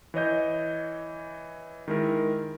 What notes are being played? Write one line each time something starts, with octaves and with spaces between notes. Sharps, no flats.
E3 C#5 D#5 G6
D#3 G#3 E4 A#4